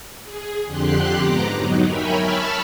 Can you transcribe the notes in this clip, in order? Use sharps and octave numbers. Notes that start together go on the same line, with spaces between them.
G#4
F2 D3 G4 C6 F#6
G#2 B3 A#5 D6
F#3 D#4
A#4 C#5 E5 G5 G#5 B5
A5 B5 C#6 E6 F6